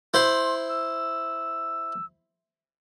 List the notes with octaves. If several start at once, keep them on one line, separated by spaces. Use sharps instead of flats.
E4 C5 C6
E6